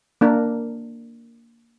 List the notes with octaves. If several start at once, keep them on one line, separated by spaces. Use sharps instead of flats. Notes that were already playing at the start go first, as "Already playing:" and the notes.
A#3 D4 A#4